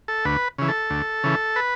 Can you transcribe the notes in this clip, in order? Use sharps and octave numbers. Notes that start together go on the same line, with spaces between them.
A4
D2 B4
C#3 E3
A4
D2
C#3 E3
B4